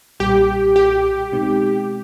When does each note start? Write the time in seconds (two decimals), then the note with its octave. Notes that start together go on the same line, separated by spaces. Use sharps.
0.20 B1 A#2 G3 G4
0.76 G4
1.32 B2 G#3 C4 D#4